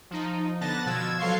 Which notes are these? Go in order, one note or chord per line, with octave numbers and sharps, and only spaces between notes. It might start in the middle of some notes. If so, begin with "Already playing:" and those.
F3 D#4
D3 B3 A5 F#6 A6 A#6
B2 F3 E6 G#6 E7
F#3 A4 F5 C6 C#6 C7